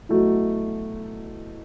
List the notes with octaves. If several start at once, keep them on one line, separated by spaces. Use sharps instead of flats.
B2 F#3 A3 E4